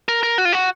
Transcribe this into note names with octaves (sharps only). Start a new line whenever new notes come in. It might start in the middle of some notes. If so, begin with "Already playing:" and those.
A#4
A#4
F#4
F4
F#4